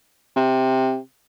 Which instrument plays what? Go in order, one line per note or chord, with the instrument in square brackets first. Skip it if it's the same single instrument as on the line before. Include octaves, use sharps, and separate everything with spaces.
[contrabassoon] C3